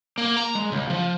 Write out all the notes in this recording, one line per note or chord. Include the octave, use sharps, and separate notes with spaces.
A#3
A#5
G#3
C#2
F3